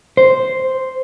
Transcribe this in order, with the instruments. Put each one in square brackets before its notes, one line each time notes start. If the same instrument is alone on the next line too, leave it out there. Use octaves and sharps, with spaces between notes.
[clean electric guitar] C5